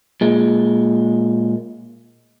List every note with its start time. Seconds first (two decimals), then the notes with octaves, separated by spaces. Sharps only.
0.21 A#2 G#3